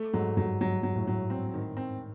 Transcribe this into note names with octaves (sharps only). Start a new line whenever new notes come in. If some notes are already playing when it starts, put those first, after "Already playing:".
Already playing: A3
G#2 F#3
G2 F#3
G#2 F#3
F#3
A2
F#3
C4
D#3
C4